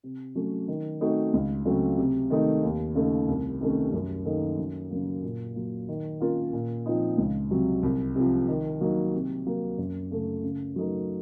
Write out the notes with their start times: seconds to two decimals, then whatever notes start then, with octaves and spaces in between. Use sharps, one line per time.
0.03 C3
0.35 F#3 A3 C#4
0.68 D#3
1.01 A3 C4 D#4 F#4
1.34 C#2
1.65 C#3 F#3 A3 C4
1.98 C3
2.30 D#3 A3 D#4
2.63 D#2
2.95 C#3 A3 D#4
3.28 C2
3.61 C3 D#3 A3 C#4
3.93 F#2
4.25 D#3 A#3 D#4 A4
4.58 F#2
4.90 C#3 F#3 A#3
5.23 A#2
5.55 F#3 A#3
5.89 D#3
6.20 A#3 C#4 F4 A#4
6.53 A#2
6.86 F3 C4 D#4
7.18 C#2
7.51 C3 F#3
7.83 C2
8.16 C3 F3
8.48 D#3
8.81 F#3 A#3 D#4
9.14 C3
9.46 F#3 A#3
9.78 F#2
10.11 C#3 A3 C#4 A4
10.43 C#3
10.76 F#3 A3 D#4 A#4